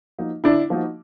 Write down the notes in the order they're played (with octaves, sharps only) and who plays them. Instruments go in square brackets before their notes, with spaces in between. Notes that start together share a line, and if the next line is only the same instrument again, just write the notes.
[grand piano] F3 A#3 D#4 F#4
[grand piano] D3 [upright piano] D4 E4
[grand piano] F3 A#3 D#4 F#4